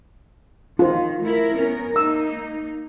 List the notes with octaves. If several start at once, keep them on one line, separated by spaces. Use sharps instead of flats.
D#3 F4 C5
A3 E4 A#4
B3 C#4 A#4
A#3 D#4 E6